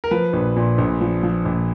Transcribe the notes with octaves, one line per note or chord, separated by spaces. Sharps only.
A#4
F3 B4
A#1
A#2
A#1
F3
F3
A#1